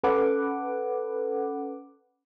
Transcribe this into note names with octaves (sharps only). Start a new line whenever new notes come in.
C#4 A4 B4 F#5 D6